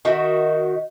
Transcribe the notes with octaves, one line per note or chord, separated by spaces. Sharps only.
D#3 D#4 F#4 E5